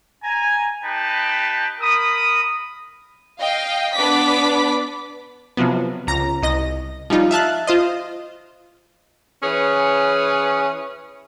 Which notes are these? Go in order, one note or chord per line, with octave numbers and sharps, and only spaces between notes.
G#5 A#5
D#4 G4 B4 G5 A5
A#4 B5 D#6
D#5 F5 G5
B3 D4 D6 B6
C3 F3 F#3 B3
C#2 A#5 A#6
C2 D#5 A#6
F3 G3 D#4 F4
E5 F5 A5 F#6
F4 C5 D#5
E3 C#4 G#4 B4 C#5